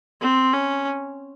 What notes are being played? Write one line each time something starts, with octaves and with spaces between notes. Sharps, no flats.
C4
C#4